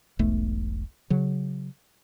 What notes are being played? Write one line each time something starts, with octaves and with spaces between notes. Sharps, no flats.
E1 B1 B2 A3
C#3 F#3